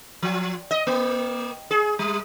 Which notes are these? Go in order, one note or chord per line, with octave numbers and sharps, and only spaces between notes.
F3
D#5
A#3
G#4
G3